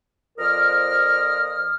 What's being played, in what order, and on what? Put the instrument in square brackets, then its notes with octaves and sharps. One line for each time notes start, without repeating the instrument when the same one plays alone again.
[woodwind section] F2 F3 A#4 D5 D#6 F6